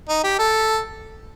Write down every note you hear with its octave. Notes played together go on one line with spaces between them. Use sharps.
D#4
G4
A4